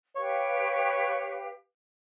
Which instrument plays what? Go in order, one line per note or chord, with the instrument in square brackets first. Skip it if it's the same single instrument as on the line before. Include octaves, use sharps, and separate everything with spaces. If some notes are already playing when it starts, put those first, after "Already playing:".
[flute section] G4 B4 F5 [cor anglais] C#5